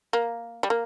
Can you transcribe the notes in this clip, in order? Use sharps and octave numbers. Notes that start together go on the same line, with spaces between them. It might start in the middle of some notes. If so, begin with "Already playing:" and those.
A#3
G3
A#3